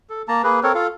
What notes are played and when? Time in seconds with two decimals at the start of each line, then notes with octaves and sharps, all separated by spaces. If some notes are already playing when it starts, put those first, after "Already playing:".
0.10 A4
0.28 A#3 A5 A#5
0.44 A#3 G#4 B4
0.63 C4 A4 A#4 C#5
0.75 F4 A4 F5